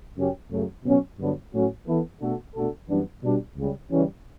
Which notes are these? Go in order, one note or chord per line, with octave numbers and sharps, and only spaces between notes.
F#2 C#3 F#3 C#4 G4
F#2 C#3 F#3 A3
B2 F#3 C#4
G2 D3 F#3 B3 D4
A2 F#3 C#4 F#4
E3 B3 E4 A4
B2 A3 D4 F#4 A4
B2 A3 D4 F#4 A4
F#2 E3 G3 B3 D4
B2 G3 D4
C#2 C#3 G3
C#3 E3 G3 C#4